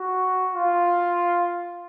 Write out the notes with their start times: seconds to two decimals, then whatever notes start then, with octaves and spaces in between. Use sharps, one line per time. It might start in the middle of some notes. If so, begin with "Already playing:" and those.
Already playing: F#4
0.53 F4